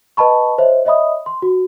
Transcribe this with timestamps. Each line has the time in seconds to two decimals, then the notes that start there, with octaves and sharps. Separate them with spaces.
0.17 B4 D#5 A5 B5 C#6
0.58 C5 C#5 D#5 E5
0.85 C#5 D#5 E5 B5 D#6
1.26 C6
1.42 F#4